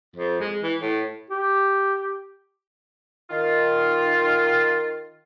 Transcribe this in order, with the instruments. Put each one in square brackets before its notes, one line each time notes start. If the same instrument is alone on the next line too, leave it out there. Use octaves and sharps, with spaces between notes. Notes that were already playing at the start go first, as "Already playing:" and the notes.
[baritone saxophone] F2
G#3
E3
A2
[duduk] G4
[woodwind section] D#3 F4